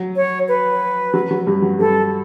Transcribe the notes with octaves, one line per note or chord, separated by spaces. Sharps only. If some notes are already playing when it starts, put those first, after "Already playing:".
Already playing: F#3
C#5
B4
F#3
F#3
G2 G3
F#3
G2 G3 A4